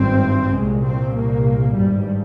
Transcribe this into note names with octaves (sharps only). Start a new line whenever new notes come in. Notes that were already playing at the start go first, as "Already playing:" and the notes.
Already playing: G#1 G2 C4
C2 A#2 G#3
C4
A#3
G#1 G2 G3